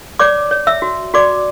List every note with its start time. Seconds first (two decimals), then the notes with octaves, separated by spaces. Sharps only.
0.19 C#5 D5 D6
0.51 C#5
0.67 E5 E6
0.82 F#4
1.14 F#4 D5 D6